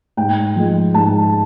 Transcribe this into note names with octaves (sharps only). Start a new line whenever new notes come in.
G#2 G5
F3 G#3
G#2 A5